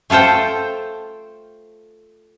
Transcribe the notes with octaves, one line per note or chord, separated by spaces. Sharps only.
A3 F4 A4 C5 G5